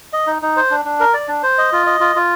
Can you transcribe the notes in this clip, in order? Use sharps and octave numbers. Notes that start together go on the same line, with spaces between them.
D#5
D#4
D#4
C5
D4
D4
A#4
D5
D4
C5
D#5
F4
D#5
F4
F4